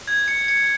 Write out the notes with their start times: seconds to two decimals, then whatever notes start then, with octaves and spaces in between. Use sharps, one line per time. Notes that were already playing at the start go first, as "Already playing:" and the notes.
0.08 G#6
0.28 C#7
0.48 C#7